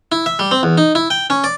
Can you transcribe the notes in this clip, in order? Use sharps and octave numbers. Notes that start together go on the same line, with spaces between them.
E4
E5
G3
C4
E2
D#4
E4
G5
C#4
D5